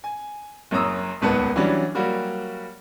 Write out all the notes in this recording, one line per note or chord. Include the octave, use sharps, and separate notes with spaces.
G#5
F#1 F#2 C#5 A#5 D#6 E6
D#1 G#1 C#2 B3 B4 A5
E3 F#3 G3 C#4 D4
F#3 G3 A#3 F#4 G4